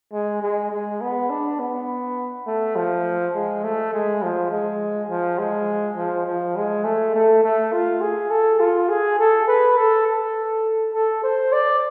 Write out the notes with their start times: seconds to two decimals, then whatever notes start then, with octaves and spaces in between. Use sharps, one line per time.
0.13 G#3
0.42 G#3
0.71 G#3
1.01 B3
1.30 D4
1.60 B3
2.47 A3
2.76 F3
3.35 G#3
3.64 A3
3.93 G#3
4.23 F3
4.51 G#3
5.09 F3
5.39 G#3
5.97 F3
6.27 F3
6.56 G#3
6.84 A3
7.15 A3
7.44 A3
7.73 F4
8.01 G#4
8.31 A4
8.60 F4
8.89 G#4
9.19 A4
9.48 B4
9.77 A4
10.07 A4
10.94 A4
11.24 C5
11.53 D5